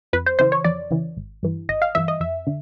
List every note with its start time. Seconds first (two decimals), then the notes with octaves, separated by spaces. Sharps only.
0.13 F2 B4
0.26 C5
0.39 C#3 E3 C5
0.52 C#5
0.64 F2 D5
0.91 C#3 E3
1.17 G#1
1.43 G2 E3
1.69 G#1 D#5
1.82 F5
1.95 G2 E3 E5
2.08 D#5
2.20 F2 E5
2.47 D3